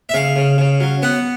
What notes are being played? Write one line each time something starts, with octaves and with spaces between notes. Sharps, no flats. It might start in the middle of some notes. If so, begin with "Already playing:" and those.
E5
C#3 F5
C#3
C#3
F#3
B3 F#5